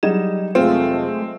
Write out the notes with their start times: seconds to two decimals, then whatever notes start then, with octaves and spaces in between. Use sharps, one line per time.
0.03 F#3 G3 D#4 G#4 E7
0.55 F1 G#3 A3 C4 F4